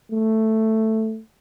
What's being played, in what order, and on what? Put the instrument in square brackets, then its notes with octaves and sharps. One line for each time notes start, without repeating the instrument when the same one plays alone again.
[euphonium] A3